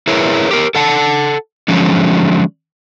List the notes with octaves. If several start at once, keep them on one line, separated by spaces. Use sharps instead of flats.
E4 G#4 A#4 B4 C#5
G4 A#4
A4 F#5 A5
D3 F3 F#3 G#3 C#4